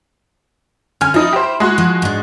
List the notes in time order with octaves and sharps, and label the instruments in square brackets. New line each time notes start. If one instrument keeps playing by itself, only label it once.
[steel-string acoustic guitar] D3 C#4 [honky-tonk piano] G#5 F6
[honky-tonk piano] F3 D#4 D#6 [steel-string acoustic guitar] E4
[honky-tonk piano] G4 C5
G#3 F#4 C6
[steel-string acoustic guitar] F3
G#2 D4